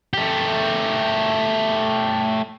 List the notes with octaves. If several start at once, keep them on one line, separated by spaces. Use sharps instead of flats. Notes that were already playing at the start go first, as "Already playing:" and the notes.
A3 G4